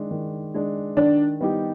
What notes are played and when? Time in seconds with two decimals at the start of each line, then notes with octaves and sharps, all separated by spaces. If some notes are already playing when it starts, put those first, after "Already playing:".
Already playing: D#3 G#3 D4
0.11 D#3
0.54 G#3 D4
0.97 D#3 D4
1.41 G3 B3 D#4 G4